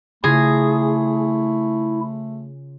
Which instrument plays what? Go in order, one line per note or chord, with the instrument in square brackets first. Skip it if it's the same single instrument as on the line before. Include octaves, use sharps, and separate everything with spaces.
[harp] C#3 F4 A#6 [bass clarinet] A3 [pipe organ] E4 [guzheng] G#4